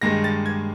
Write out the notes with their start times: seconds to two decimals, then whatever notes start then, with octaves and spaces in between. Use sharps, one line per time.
0.01 G2 D#3 G#3 A#6
0.24 A6
0.46 G#6